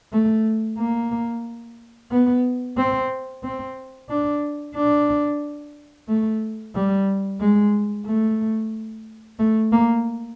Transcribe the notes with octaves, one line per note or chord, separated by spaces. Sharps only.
A3
A#3
B3
C4
C4
D4
D4
A3
G3
G#3
A3
A3
A#3